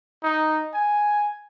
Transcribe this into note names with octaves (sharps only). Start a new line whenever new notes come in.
D#4
G#5